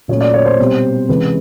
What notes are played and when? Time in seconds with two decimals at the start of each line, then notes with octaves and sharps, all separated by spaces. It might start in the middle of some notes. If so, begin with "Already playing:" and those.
0.08 A#2 F#3 A3 C#4 C#5
0.21 D5
0.34 C#5
0.46 C5
0.59 B2 G3 C4
1.09 C3 E3 G#3 C#4 B4